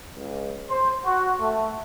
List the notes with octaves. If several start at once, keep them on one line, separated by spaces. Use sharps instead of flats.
C#2
C5
F#4
A3